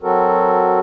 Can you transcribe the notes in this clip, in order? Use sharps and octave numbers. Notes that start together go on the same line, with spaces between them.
F#3 C4 F#4 A4 A#4